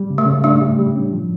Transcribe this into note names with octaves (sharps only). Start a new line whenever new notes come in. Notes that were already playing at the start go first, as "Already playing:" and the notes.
Already playing: G3
C#3
A3
C#3
A3 D4
G4
G3
C#4
F3